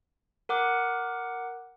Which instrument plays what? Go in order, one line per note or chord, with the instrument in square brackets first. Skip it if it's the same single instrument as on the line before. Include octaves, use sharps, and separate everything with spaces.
[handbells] A#4 F#5 D6 F#6